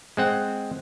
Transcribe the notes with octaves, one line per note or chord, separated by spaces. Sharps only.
G#3 C4 F#5